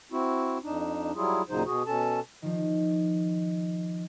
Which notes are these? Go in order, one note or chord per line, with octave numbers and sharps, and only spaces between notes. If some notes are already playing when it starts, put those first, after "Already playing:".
C4 E4 F#4
F2 D4 D#4
F#3 G3 E4 F4 G#4
D#2 A#2 C#3 F#3 D#4 C5
B2 F#4 G#4
B2 C#4 A4 A5
D#3 F3